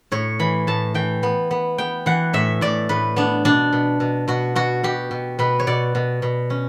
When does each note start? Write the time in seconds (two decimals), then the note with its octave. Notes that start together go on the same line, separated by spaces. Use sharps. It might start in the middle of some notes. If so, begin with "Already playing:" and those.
0.12 A2 C#5
0.40 E3 B5
0.67 A2 A5
0.94 E3 G5
1.23 B3
1.51 B3
1.78 B3 G5
2.06 E3 F#5
2.33 A2 E5
2.61 A2 D5
2.89 A2 B4
3.16 B3 D4
3.45 B2 D4
3.73 B2
4.00 B2
4.28 B2 F#4
4.56 B2 F#4
4.84 B2 G4
5.11 B2
5.39 B2 B4
5.60 C#5
5.67 B2 D5
5.95 B2
6.22 B2
6.50 C#4